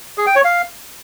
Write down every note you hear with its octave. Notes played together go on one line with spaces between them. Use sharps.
G#4
G5
C#5
F5